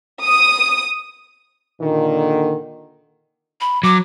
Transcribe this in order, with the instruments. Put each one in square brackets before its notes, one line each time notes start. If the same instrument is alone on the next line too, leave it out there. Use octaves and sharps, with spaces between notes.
[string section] D#6
[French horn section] A#2 D3 D#3
[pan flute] B5
[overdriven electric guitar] F#3 [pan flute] D6